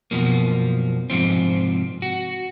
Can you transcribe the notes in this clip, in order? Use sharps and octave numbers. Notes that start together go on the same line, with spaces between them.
F#2 B2 F3 A#3
G#2 C3 F3 C4
F#4